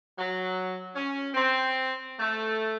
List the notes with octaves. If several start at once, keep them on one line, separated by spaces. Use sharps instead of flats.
F#3
C#4
C4
A3